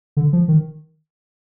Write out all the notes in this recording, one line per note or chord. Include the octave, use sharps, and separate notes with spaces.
D3
F3
D#3